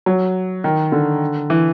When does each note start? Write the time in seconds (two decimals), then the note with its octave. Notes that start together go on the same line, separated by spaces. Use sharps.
0.06 F#3
0.64 D#3
0.92 D3
1.50 E3